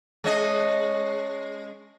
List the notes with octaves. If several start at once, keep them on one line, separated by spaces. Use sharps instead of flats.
G#3 C#4 D#5